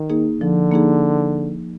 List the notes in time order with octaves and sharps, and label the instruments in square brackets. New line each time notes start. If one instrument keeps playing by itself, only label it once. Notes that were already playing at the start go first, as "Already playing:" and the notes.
Already playing: [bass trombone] D#3
[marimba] A#3 D#4 G#4
[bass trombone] D3 [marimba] F3
[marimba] A#3 D#4 G#4